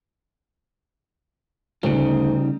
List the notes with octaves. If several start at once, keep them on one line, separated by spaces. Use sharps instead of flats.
D2 C#3 G3 D#4